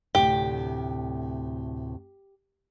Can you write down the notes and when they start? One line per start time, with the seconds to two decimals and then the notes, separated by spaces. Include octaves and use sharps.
0.15 D2 A2 C3 G4